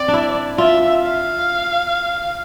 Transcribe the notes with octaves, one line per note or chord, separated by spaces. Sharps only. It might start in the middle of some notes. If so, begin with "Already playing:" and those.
Already playing: C4 D5
D4
E4
F4 E5
F5